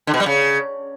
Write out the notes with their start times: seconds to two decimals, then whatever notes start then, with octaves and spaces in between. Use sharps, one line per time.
0.07 D3
0.14 B2
0.20 G3
0.26 C#3